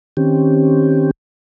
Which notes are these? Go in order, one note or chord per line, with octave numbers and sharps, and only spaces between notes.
D#3 C4 C#4 G4